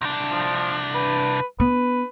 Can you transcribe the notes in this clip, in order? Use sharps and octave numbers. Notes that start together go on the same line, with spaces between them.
C2 D4
F3
B4
B3 D4 B4